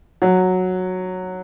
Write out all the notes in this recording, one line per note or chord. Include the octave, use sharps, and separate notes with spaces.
F#3